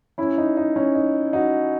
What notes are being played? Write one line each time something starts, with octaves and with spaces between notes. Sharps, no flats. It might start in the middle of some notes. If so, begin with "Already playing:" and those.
C#4 E4
D#4
D#4
C#4
D#4
D#4 F#4